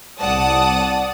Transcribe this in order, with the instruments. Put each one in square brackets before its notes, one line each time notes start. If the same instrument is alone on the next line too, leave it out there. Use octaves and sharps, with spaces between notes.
[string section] C2 D5 F#5 A5 D#6